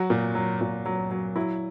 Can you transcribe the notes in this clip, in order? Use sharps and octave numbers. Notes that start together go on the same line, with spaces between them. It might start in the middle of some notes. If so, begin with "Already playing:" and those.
Already playing: F#3 F#4
A#2
F#3
A#2
F#3
F#3
F#3 E4